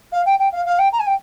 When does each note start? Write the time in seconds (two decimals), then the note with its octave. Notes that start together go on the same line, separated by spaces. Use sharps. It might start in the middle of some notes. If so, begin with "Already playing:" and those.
0.12 F5
0.25 G5
0.39 G5
0.52 F5
0.65 F5
0.78 G5
0.92 A#5
0.99 G#5
1.06 G5